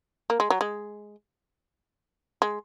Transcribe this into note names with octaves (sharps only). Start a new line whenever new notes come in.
A#3
G#3
F#3
G#3
G#3